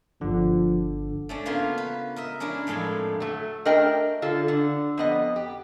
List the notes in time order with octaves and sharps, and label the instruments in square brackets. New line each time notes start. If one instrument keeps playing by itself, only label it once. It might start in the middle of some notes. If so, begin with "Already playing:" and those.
[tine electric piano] G1 D3 [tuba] F3
[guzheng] A3 C#4 D4
C#3 A#3 B3 F4 F#4 A#4
B4
A#4 D#5 E5
C#4 D4 E4 A#4
F2 A2 G#3 A4 C6
[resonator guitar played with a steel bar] F#3 A3
A3 D4 F#4 A#4 D#5 G5
D3 F4 A4
D3
F2 B3 D#5
G4